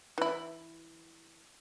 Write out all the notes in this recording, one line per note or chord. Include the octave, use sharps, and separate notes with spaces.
E3 E4